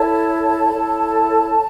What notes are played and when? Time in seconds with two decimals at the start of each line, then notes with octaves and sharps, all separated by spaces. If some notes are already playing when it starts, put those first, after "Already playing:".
Already playing: E4 A4 C#5 A5
0.73 E4 A4 C#5